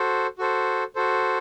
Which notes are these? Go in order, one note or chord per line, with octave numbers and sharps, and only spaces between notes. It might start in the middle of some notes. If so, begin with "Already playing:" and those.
Already playing: F#4 A4 C5
F#4 A4 C5
F#4 A4 C5